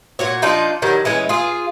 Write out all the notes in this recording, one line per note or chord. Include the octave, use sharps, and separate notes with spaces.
A#2 F#4 C#5
F3 D4 D#4 F4
D#3 F#3 G3
E3 G#3 C#4
F4 G#4